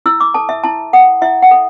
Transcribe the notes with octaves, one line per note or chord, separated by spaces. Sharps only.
E4 E6
D6
A4 A5
E5
E4 A5
A4 F#5
E4 E5
F#5
A4